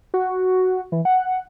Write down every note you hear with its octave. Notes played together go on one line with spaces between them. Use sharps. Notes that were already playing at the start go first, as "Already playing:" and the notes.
F#4
E3
F#5